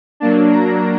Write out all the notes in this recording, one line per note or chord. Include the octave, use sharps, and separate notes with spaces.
F#3 A#3 D4 A5
A#5